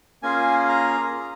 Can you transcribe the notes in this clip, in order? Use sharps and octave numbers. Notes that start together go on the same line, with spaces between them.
A#3 C#4 F4 G#4 G#5
A#5